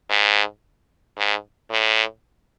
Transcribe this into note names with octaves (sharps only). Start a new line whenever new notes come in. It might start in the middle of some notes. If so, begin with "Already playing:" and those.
G#2
G#2
A2